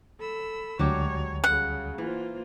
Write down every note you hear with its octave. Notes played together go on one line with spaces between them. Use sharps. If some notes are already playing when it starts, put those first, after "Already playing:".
A4 B5 E6
D2 F#3 G#3 D4 G4 C#5
C#3 G3 F#5
E3 A#3 F4 C5